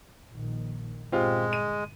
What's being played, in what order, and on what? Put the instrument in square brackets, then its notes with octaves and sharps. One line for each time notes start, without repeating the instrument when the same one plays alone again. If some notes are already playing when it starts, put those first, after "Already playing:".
[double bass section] A#1 A#2 D#3
[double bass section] G1 A#2 [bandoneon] G#3 [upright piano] C4 F4 G4
[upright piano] D#7